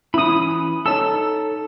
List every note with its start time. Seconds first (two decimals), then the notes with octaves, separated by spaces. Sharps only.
0.14 E3 C#4 E4 B5 D#6
0.86 D#4 A4 C#5 A5 E6